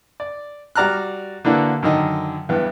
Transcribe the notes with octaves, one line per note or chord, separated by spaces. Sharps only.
D5
G3 F#4 D5 A#5 F6 F#6
D3 E3 A#3 D4 F#4
F#2 D3 D#3 D#5
E2 G2 B3